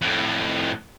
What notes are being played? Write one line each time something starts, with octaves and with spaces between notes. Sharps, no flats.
F2 A2